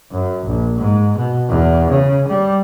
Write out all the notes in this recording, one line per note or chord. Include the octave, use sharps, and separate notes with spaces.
F#2
A#1
G#2
B2
E2
C#3
G3